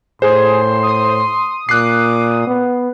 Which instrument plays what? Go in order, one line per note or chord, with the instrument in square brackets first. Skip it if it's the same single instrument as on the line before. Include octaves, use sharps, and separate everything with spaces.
[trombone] A2 [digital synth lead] G#4 [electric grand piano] C5 [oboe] C6
[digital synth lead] D#6
[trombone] A#2 [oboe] D6 [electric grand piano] F#6 C7
[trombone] B3